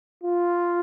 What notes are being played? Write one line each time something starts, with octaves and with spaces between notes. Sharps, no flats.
F4